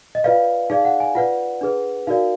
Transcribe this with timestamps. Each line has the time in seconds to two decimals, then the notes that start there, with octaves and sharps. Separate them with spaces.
0.15 D#5
0.24 F4 B4 D5 F5
0.70 D#4 G#4 D5 F5
0.85 F#5
1.00 G#5
1.15 F4 B4 D5 F#5
1.61 D4 G#4 B4
2.07 D#4 F#4 A#4 D5 F5